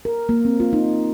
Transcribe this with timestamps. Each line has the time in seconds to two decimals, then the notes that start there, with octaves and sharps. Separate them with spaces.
0.05 A#4
0.29 A#3
0.45 C4
0.60 F4
0.73 D#4